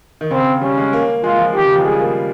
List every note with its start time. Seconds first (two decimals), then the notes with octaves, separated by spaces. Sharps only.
0.21 D#3
0.31 C#3 C4
0.61 G3 C#4
0.78 G#3
0.93 A#3
1.23 G#3 F4
1.38 F3
1.54 D#3 G4
1.65 C#3
1.75 F3
1.80 G#3
1.85 G3 G#4
2.00 A#3